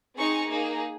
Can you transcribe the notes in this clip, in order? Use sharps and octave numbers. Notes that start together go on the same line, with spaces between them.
C4 D#4 G#4 C#6
A#3 D#4 G#4